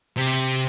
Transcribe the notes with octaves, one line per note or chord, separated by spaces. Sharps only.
C3